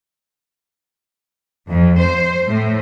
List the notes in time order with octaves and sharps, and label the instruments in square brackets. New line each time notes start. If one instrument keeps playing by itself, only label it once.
[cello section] F2
C5
A2